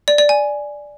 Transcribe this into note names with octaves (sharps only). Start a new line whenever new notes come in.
D5
D5
G#5